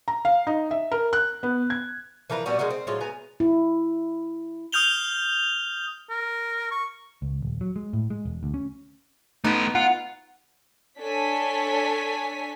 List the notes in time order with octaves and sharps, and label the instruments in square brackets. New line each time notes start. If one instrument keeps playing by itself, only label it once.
[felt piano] A#5
F5
D#4
E5
A#4
F#6
B3
G#6
[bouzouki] E3 F3 A#4 B4
A#2 G3 B3 F#4
G#3 A#3 D#4 F#4
C4
A2 F#3 G#3 F4
B3 G#5 A#5
[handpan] E4
[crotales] D#6 F6 G6 F7 G7
[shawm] A#4
C#6
[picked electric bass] C#2
D#1
F#3
G#3
A2
G#3
E1
D2
C#4
[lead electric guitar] A3 B4 [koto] B3 D#4
[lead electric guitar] F4 [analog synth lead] F#5
[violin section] D4 A4 C#5 G#5 B6